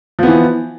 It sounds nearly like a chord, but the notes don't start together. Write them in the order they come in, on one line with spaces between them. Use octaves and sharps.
F3 B3 E3